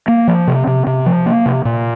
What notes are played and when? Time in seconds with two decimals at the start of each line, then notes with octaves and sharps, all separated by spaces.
0.08 A#3
0.28 F3
0.47 C3
0.67 C3
0.87 C3
1.06 F3
1.26 A#3
1.46 C3
1.65 A#2